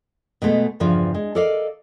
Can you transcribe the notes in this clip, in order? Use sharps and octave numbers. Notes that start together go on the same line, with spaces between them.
B2 G#3 A3 B3
E2 G2 C#3 F3
G#3
A4 A#4 D5 D#5 F5